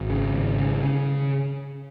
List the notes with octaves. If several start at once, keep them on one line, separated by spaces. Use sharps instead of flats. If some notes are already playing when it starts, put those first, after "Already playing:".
Already playing: G#1
C#3
G#1
C#3
C#3